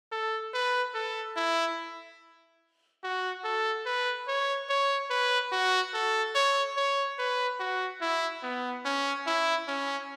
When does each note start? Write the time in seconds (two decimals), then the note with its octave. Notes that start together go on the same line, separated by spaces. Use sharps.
0.12 A4
0.54 B4
0.95 A4
1.36 E4
3.04 F#4
3.44 A4
3.86 B4
4.28 C#5
4.69 C#5
5.10 B4
5.52 F#4
5.94 A4
6.35 C#5
6.76 C#5
7.19 B4
7.60 F#4
8.01 E4
8.43 B3
8.85 C#4
9.27 E4
9.68 C#4